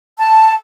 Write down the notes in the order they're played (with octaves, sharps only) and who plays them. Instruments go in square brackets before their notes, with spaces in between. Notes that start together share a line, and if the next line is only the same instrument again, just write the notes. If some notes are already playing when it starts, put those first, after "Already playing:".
[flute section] A5